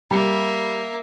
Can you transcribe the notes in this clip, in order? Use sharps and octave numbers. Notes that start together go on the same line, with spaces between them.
G3 A#3 E5